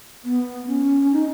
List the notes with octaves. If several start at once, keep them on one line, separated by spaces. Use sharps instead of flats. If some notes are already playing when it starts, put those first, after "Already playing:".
B3
C#4
D#4